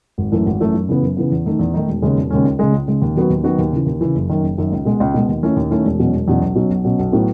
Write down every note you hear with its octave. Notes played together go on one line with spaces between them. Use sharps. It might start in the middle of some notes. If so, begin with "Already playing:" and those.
G#1
F#2 E3 A3
G#1
F#2 E3 A3
F#2
C#3 E3 B3
F#2
C#3 E3 B3
E2
D#3 A3 D#4
E2
D#3 A3 D#4
E1
D#2 C#3 G#3 C#4
E1
D#2 C#3 G#3 C#4
C#2
C#3 G#3
C#2
C#3 G#3
D#2
D#3 F#3 B3 F#4
D#2
D#3 F#3 B3 F#4
D#2
C#3 E3
D#2
C#3 E3
F#1
F#2 D#3
F#1
F#2 D#3
C#2
B2 G#3
C#2
B2 G#3
D#2
D#3 A3 C#4 E4
D#2
D#3 A3 C#4 E4
E1
E2 B2 F#3 C#4
E1
E2 B2 F#3 C#4
B1
B2 F#3 C#4
B1
B2 F#3 C#4
B1
A2 F#3 B3 E4